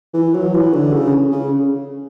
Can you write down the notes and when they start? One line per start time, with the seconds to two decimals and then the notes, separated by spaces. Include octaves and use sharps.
0.13 E3
0.34 F#3
0.54 E3
0.73 D3
0.93 C#3
1.32 C#3